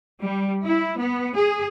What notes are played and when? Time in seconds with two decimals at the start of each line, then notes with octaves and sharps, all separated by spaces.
0.21 G3
0.63 E4
0.97 B3
1.35 G#4